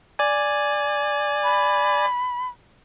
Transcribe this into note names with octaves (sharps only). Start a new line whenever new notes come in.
D5 G#5
B5